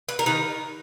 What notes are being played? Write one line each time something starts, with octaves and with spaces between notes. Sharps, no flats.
B4
A#4
D#3 A#3 D#4 B4